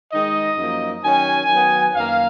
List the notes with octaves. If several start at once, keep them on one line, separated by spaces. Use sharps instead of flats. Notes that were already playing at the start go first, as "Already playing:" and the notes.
D#3 G#3 D#4 D#5
F#2 F3 A#3 D#4
D#3 F#3 C#4 G#5
D#3 F#3 B3
F#2 D#3 A#3 F5